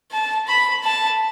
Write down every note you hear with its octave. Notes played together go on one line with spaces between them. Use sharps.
A5
B5
A5